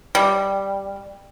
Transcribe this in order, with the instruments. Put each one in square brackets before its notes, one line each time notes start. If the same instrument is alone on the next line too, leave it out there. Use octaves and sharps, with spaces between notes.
[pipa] G3